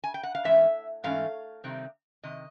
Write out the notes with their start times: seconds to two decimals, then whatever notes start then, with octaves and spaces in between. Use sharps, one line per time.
0.04 G#5
0.14 G5
0.23 F#5
0.35 F5
0.44 G#2 E3 A3 C#4 E5
1.04 G#2 E3 A3 C#4 F5
1.64 C3 D#3 G3 C4 D#4
2.23 C3 D#3 D#5